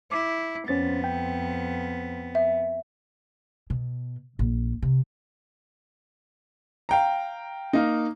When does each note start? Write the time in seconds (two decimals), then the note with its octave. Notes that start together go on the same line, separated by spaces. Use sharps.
0.12 E4 D6
0.68 F2 B3 C#4 C5 A6
1.04 G5
2.35 E5
3.70 B2
4.39 A#1
4.82 C3
6.89 F5 G5 A#5
7.73 A#3 D#4